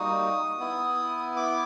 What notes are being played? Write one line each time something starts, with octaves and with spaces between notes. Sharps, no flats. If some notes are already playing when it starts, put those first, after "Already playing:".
Already playing: G3 A#3 D#4 F#4 D#6
B3 E4
D6